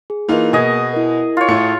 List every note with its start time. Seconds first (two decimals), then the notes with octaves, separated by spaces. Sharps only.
0.10 G#4
0.29 E3 A#3 D#4 F4 A#4
0.53 B2 G#4 D#5 G#5
0.93 E4 A#4
1.37 F4 C#5
1.48 A2 A3 C#7